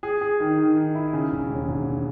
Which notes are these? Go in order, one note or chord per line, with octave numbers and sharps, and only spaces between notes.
G#4
G#4
D#3
D#3
D#3
E4
C#3
E1
D#2
E1